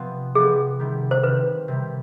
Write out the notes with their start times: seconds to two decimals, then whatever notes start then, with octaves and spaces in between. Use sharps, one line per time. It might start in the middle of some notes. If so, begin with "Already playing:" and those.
Already playing: C3 F3 B3
0.35 C3 F3 B3 G#4
0.79 C3 D#3 G3
1.11 C5
1.23 C3 D#3 G3 B4
1.68 C3 D#3 G3